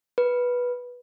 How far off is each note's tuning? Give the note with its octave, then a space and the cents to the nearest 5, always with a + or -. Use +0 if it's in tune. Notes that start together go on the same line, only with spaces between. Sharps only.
B4 -10